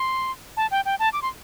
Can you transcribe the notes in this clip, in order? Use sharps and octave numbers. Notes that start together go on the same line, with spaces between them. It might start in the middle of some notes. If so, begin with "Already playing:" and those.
Already playing: C6
A5
G5
G5
A5
D6
C6